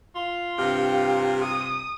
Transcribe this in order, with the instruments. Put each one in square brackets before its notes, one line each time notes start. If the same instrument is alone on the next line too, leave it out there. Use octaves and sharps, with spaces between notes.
[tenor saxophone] F4
[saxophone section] G2 C3 [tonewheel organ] G4 F5 [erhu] G5
[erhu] D#6